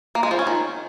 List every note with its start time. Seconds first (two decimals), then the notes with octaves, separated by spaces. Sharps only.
0.15 A#3
0.23 G#3
0.31 F3
0.39 C#4
0.47 D#3